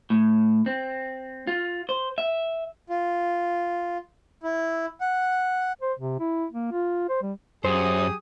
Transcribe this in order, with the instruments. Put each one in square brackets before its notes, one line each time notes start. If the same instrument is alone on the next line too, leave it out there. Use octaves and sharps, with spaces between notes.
[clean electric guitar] A2
C4
F4
C5
E5
[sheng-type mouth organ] F4
E4
F#5
[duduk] C5
C3
E4
A#3
F4
C5
G3
[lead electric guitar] F#2 [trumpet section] G4 G#4 D#6 [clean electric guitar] C5